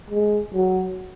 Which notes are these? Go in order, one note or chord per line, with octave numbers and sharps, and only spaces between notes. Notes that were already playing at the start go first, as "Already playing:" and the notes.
G#3
F#3